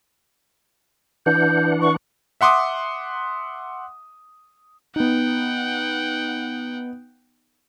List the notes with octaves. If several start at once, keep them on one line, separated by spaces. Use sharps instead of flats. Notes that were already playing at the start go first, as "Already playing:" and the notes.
E3 D4 F#5 G6
C#6
E5 F#5 C6 D6 D#6
B3 D#4 F#5 G5